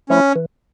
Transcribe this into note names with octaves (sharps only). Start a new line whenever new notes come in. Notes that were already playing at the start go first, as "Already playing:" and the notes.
F3 A3 C#4 E4
E3